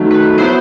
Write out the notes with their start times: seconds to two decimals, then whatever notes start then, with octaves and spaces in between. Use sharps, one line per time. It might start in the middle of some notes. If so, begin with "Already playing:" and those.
Already playing: D#3 F#3 A3
0.11 B4
0.38 F#3 B3 E4 C5